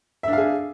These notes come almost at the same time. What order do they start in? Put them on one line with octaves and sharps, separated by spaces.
E5 D4 F5 G#4